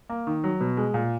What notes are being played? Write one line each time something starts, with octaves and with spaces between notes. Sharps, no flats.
A#3
D#3
F#3
B2
G#3
A#2